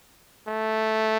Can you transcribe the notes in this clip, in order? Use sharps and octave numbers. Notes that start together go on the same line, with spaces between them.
A3